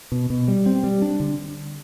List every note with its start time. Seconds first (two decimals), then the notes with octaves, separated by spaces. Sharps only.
0.12 B2
0.30 B2
0.48 G3
0.66 C4
0.84 G3
1.02 D4
1.20 D3